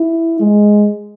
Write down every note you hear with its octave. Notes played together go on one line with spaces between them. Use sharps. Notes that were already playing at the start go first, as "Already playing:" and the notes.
Already playing: E4
G#3